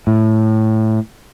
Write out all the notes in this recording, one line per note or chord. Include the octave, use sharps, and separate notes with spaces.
A2